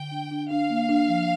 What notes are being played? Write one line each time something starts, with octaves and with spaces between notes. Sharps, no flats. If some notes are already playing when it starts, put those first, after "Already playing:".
Already playing: D3 G5
D4
D4
D4 F5
A#3
D4
F3